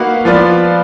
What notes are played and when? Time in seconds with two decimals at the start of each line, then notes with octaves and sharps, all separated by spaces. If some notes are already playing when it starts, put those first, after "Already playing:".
Already playing: A#3 D#4 F#4 B4 F5
0.25 F3 B3 F4 B4 D5